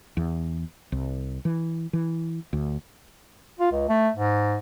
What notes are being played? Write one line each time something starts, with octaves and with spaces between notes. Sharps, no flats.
E2
C2
E3
E3
D2
F4
C#2
A3
G#2